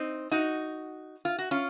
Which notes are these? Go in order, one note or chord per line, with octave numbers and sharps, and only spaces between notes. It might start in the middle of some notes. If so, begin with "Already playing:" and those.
Already playing: C4 D#4
D#4 F#4
F4
F#4
C#4 F4